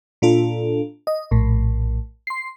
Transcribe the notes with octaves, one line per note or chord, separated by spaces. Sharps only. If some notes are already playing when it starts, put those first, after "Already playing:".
A#2 D4 F4 A4
D#5
A#1 A2
C6 C7